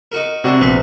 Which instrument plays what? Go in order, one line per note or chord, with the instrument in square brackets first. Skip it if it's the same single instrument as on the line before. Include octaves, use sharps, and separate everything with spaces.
[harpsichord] D#4 F#4 A#4
[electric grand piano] C3 F#4 [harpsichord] G3 C4 D4
[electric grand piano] A#1 [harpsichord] B3 C4 B4